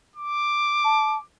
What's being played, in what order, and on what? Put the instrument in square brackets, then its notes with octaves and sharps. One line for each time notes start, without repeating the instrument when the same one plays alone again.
[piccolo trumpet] D6
[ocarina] A5